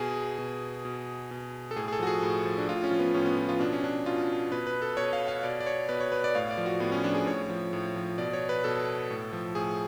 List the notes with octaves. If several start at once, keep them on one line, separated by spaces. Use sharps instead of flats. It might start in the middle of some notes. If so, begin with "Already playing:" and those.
Already playing: B2 G#4
B2
B2
B2
A4
A2 G#4
G#4
A4
F3 F#4
G#4
A2
F3
D4
A2 F4
C#4
F3
B3
A2 C#4
B3
F3
F4
B2 D4
C#4
D4
B2 F4
B2 B4
B4
A4
B2 C#5
F5
F5
B2 D5
D5
C#5
B2 B4
C#5
B4
D5
A2 F5
D5
F3
F#4
A2 B3
C#4
F3 D4
G#4
A2 C#5
F3
A2
F3
B2 D5
C#5
B4
B2 A4
A2
F3
A2 G#4